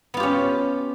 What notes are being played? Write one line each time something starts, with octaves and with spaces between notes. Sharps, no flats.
B3 C#4 F4 G4